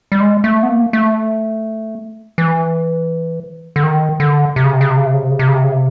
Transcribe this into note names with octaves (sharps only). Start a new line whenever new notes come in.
G3
G#3
A3
B3
A#3
A3
E3
D3
D#3
D3
C3
C#3
C3
C#3
C3
C#3
C3
C#3
C3
C#3
C3
C#3
C3
C#3
C3